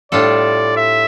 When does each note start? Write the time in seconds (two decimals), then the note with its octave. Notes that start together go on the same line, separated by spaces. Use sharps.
0.12 A2 G3 D4 F4 A4 D5
0.77 E5